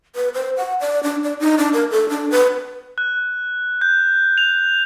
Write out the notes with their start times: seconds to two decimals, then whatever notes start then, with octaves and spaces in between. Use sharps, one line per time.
0.16 B4
0.34 C5
0.57 F#5
0.80 D5
1.03 D4
1.24 D5
1.40 D#4
1.58 D4
1.73 A#4
1.91 A4
2.09 D4
2.31 B4
2.98 F#6
3.81 G6
4.38 F7